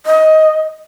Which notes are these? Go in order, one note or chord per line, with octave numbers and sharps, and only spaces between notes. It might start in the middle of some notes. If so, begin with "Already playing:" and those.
D#5